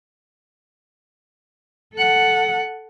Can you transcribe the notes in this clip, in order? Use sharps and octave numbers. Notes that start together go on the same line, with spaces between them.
A4 F#5